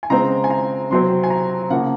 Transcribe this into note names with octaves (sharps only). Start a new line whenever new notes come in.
G#5
C#3 G#3 C4 A#5
G#5
A#5
C3 F#3 C4 C6
G#5
A#5
C#3 F3 A#3 F#5